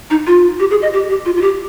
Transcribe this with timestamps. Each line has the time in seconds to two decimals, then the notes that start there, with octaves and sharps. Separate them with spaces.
0.10 D#4
0.27 F4
0.60 G4
0.70 G#4
0.82 D#5
0.93 G4
1.09 G4
1.25 F4
1.37 F4
1.41 G4